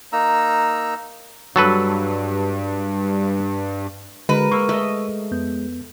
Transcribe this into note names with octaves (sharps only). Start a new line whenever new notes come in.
A#3 D#4 A#5 E6
G2 F#3 A4 B4
D3 G#3 F#4 A#4 B4
A#3 C#6 E6 F6
A3 D#5
F2 B3 G6